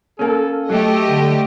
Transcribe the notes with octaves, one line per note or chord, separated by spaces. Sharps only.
A#3 C#4 A4
F#3 A3 G4 A4 D#5
D3